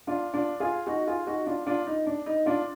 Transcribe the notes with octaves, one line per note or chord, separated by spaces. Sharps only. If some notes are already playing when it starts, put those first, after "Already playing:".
D4 F4
D4 F4
F4 G#4
D#4 F#4
F4 G#4
D#4 F#4
D4 F4
D4 F4
D#4
D4
D#4
D4 F4